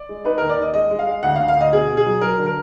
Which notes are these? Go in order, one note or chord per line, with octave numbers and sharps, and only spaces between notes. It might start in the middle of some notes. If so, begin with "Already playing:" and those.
Already playing: D5
G#3
D#4 B4
D#2 A#4
D5
D#2 D#5
G#3 D#5
G#3
F5
G#3
D2 F#5
F5
D2
F5
D2 D#5
B2 G#4
B2
G#4
F#3
F#3 A#4
D3
A#4